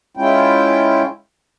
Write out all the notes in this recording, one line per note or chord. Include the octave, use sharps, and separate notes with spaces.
G#3 C#4 E4 F4 G5